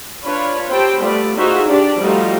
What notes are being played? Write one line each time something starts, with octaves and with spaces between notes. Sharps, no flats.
D4 F4 B4 C#5
C4 G4 C5 G5 A5 B5
G3 A3 B3 F4 D5
D#4 F4 F#4 G#4 C5 E5
D4 G4 D5
F3 G3 A3 D#4 F4 F#4